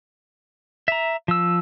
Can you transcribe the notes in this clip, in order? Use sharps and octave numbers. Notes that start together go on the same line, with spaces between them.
E5 A#5
F3 E6